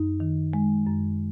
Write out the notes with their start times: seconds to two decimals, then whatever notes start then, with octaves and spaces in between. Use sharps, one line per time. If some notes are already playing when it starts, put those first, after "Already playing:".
Already playing: F#2 D#4
0.20 D#3
0.53 G#3
0.87 F#2